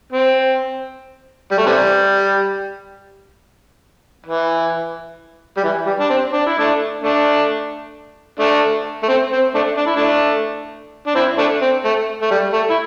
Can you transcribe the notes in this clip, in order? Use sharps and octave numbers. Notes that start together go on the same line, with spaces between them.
C4
G3
A3
C3 E3 G3
E3
G3
E3
G3
D4
C4
D4
E4
A3 D4
A3 D4
A3 D4
A3
C4
C4
A3 D4
D4
E4
A3 D4
D4
C4 E4
A3 D4
C4
A3
A3
G3
A3
E4